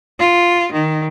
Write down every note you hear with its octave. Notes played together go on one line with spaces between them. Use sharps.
F4
D#3